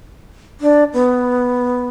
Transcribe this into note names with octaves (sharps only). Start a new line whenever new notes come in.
D4
B3